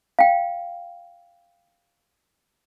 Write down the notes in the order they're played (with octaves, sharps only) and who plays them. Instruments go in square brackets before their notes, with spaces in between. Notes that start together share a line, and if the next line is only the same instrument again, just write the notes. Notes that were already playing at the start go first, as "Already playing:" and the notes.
[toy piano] F5 G5